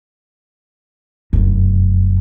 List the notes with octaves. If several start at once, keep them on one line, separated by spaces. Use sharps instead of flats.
F1 F#2